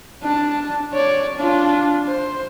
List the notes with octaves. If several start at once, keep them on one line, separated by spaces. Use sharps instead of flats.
D4 A5
C#5 D5
D4 F4
C5